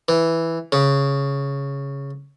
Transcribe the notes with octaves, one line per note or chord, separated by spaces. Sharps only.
E3
C#3